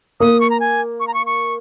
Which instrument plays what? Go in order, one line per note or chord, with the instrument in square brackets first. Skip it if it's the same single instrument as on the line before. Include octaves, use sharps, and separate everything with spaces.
[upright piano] A#3 [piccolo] D#6
[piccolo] C#6
A#5
G#5
C#6
A#5
C#6
C#6